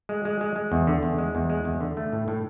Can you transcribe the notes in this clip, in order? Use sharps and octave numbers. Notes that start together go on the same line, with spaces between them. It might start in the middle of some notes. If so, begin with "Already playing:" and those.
G#3
G#3
G#3
G#3
E2
D3
E2
G#3
E2
G#3
E2
D3
A3
A2
A2